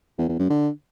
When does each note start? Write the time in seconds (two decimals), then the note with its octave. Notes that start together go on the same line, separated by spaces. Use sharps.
0.18 E2
0.29 E2
0.39 F#2
0.50 D3